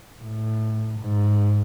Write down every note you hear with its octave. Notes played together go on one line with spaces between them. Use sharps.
A2
G#2